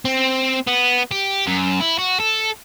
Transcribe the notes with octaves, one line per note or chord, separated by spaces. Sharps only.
C4
B3
G4
F#2
E4
F#4
A4